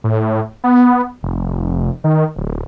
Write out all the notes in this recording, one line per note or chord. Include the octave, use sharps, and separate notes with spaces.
A2
B3
F1
D#3
D1